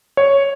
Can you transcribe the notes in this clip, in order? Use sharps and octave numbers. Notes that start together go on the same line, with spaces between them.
C#5